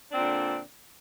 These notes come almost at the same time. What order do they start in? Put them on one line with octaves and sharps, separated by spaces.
D4 C4 A#2 D3